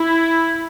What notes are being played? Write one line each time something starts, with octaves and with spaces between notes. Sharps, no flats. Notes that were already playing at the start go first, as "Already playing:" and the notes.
Already playing: E4